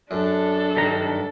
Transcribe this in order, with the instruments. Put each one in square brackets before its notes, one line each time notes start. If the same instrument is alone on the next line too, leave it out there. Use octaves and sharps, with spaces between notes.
[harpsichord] F#2 [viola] D4 A4
[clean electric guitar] G2 D#3 A#5